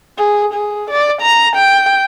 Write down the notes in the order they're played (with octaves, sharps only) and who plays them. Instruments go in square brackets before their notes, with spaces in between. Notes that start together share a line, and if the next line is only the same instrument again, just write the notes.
[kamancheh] G#4
G#4
D5
A#5
G5